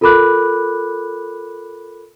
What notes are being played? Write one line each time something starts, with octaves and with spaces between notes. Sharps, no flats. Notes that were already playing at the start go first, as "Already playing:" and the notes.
F4 A4 A#4 B5 D6 F#6